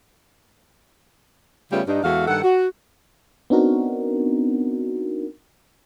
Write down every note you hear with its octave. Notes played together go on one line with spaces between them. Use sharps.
C#3 G3 A3 B3 C#4 F4
G2 D4 D#4
E2 G#3 F#4 A4 E5 F5
G2 D#3 A4 F#5
F#4
B3 C4 D4 D#4 F#4 A#4